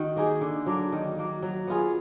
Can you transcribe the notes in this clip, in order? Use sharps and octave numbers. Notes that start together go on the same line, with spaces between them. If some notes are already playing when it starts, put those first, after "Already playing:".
Already playing: D#3 F#4
A#3 D#4 G#4
D3
F#3 A#3 D4
D#3
F#3 A#3
F#3
B3 F4 G#4